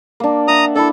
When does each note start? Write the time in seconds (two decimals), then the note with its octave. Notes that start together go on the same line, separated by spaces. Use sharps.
0.20 A#3 D4
0.48 E5 F#5 A#5 D#6
0.76 D4 E4 A4